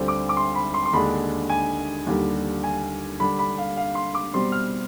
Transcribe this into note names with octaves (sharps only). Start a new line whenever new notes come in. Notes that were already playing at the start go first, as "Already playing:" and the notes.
Already playing: D2 D3 G3 C4
D6
D6
C6
B5
C6
C6
D#2 D3 G#3 D4 B5
G#5
D#2 D3 G3
G#5
D3 G3 D4 B5
B5
F5
F5
C6
D6
B2 G3 C4 C6
F6